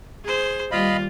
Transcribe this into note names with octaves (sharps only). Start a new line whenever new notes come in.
G#4 C5
D#2 G3 F4 D#5 F5 B5